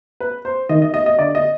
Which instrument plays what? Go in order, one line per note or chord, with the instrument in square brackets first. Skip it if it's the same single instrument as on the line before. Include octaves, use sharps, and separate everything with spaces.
[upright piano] B4
C5
[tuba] D#3 [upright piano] D#5
[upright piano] D#5
D#5
D#5
[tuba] D3 [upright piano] D5
[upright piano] D#5